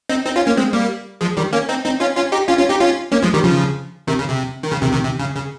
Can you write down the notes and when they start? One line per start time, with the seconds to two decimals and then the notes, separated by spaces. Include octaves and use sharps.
0.09 C4 D#4
0.25 C4 D#4
0.36 C#4 F4
0.47 A#3 C#4
0.57 G#3 C4
0.73 G3 A#3
1.21 F3 G#3
1.37 D#3 G3
1.53 A#3 C#4
1.69 C4 D#4
1.84 C4 D#4
2.00 C#4 F4
2.16 C#4 F4
2.32 D#4 G4
2.48 C#4 F4
2.59 C#4 F4
2.69 D#4 G4
2.80 C#4 F4
3.12 A#3 C#4
3.23 F3 G#3
3.34 D#3 G3
3.44 C#3 F3
4.07 C3 D#3
4.19 C#3
4.29 C3
4.63 D#3
4.71 C#3
4.82 C3 D#3
4.93 C3 D#3
5.04 C3
5.19 C#3
5.35 C#3